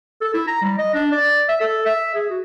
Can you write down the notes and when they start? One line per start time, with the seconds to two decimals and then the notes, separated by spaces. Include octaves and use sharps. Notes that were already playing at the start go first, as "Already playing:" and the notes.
0.21 A4
0.34 E4
0.48 A#5
0.62 G3
0.78 D#5
0.94 D4
1.12 D5
1.49 E5
1.61 A4
1.86 E5
2.15 G#4
2.30 F#4